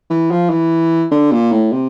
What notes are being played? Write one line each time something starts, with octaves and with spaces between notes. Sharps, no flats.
E3
F3
E3
D3
A#2
A2
C3